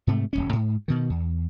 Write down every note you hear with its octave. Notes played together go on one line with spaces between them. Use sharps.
G#2 C3 A3
D1 G1 C#4
G#2
B2 D#3
E2